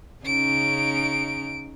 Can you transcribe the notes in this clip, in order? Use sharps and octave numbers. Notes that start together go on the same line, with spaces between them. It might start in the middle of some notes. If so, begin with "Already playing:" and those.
C#3 C#4 D#4 D7